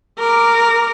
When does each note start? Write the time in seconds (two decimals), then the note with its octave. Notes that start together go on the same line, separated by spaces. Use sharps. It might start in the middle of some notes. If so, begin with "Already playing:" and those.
0.19 A#4 D6